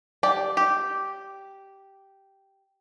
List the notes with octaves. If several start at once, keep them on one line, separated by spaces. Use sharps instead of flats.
G4 D5
G4